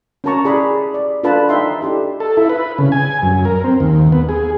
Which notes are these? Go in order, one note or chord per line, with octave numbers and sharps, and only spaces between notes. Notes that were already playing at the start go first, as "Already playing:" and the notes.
C#4 F#4 A#4 A5 A#5 C#6
E4 G#4 D5 B5
D5
D4 F4 A4 B4 A5 B5
D#4 B4 D#5 E5 G5 C6
D4 E4 G4 A4
A4
E4
B4
C#3
G#5
F#2
A#4
C4
D#2
B3
G#4